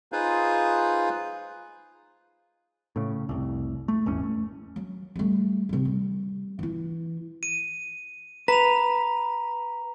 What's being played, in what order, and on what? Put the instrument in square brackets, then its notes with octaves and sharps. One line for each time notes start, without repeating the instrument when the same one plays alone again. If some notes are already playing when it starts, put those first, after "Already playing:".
[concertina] D#4 F4 G#4 B4 C5 F5
[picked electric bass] A2 C#3
F1 C2
A3
D#1 G#1 E2 C#4
A3
[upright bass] F#3
G3 A3
C3 D#3
G3
E3 E4
[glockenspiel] D#7
[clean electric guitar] B4 [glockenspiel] A#5 F7